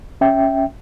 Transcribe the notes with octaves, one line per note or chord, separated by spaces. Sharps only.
C#4 E5 G5